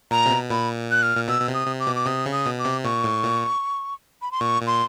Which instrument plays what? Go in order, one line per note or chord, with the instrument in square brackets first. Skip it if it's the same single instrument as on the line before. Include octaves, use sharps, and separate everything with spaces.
[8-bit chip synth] A#2 [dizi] A#5
[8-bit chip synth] C3
B2
[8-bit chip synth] A#2 [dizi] B5
[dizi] F#6
F6
[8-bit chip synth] A#2
[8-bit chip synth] B2 [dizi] E6
[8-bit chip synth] B2
C3
[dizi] D#6
[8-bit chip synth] C3
[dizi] D6
[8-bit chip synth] B2
[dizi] D6
[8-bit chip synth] C3 [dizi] D#6
[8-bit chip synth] C#3
[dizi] D#6
[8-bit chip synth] B2
[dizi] D6
[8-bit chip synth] C3
[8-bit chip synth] A#2 [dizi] C#6
[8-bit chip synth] A2
A#2
[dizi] B5
C6
[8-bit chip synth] A#2 [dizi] C#6
[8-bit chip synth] A#2
[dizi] C6